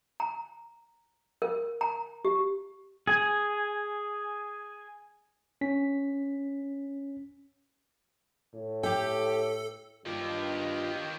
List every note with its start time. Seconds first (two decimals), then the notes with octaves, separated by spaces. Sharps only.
0.20 A#5
1.42 A#4
1.81 A#5
2.25 G4
3.07 G#4 G#5
5.61 C#4 B6
8.54 A2
8.83 G4 A4 G5
10.06 G2 D#3 F4 G4